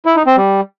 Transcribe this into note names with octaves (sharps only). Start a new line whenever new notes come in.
E4
D#4
C4
G3